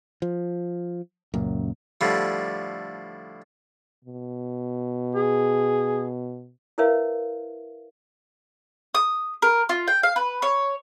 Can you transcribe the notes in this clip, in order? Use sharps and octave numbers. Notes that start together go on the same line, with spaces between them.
F3
C#2 F#2 A#2
A2 D3 F3 G3
B2
G#4
E4 A#4 B4 C#5 E5 F5
D#6
A#4
F4
G5
F5
B4
C#5